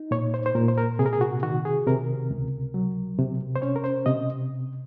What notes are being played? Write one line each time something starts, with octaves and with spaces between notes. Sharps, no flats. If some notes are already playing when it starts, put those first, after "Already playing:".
Already playing: D#4
A#2 C#5
C5
C5
A#2 A#4
C5
A#4
C3 G#4
A#4
G#4
F#4
D#3 F#4
G#4
C3 A#4
C#2
F#3
C3
C5
C#4 C#5
A#4
C5
C3 D#5